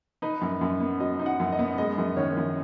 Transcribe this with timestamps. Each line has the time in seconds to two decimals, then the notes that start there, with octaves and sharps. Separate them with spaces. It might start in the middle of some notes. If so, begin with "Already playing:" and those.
0.22 D#4 B4
0.41 F#2
0.61 F#2
0.80 B3
1.00 F#3 D#5
1.19 D#4
1.26 F#5
1.40 F#2
1.52 D#5
1.59 B3
1.78 G#3 D#5
1.98 F#2
2.17 D#3 C#5
2.37 F#2